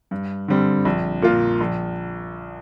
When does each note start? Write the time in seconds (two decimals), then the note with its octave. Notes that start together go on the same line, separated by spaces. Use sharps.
0.11 G2
0.48 D3 G3 C4
0.85 A#1
1.22 A#2 A#3 F4
1.61 A#1